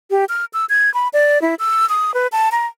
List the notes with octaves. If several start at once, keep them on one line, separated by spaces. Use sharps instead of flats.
G4
F6
E6
G#6
B5
D5
E4
E6
D#6
B4
A5
A#5